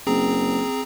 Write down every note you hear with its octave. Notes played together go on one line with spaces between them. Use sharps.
F#1 C4 G#4 A#5